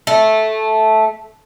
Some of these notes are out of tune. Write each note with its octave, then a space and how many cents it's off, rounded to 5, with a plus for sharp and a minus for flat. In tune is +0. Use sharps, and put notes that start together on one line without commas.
A3 -10